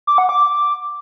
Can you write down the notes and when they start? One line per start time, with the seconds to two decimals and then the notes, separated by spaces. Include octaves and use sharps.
0.07 D6
0.18 F#5
0.29 D6